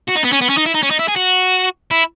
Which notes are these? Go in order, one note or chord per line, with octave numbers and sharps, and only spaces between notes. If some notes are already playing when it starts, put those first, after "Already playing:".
F#4
D#4
B3
C#4
B3
C#4
D#4
E4
D#4
C#4
D#4
E4
G#4
F#4
E4